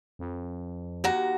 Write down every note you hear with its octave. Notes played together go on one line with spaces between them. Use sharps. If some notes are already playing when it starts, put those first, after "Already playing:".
F2
D#2 F#4 A#5